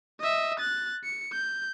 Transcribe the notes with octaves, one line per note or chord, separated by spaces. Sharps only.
D#5 E5
F#6 A6
C#7
G6